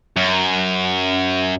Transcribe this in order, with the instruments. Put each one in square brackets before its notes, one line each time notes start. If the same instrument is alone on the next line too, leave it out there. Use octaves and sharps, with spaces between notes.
[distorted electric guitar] F#2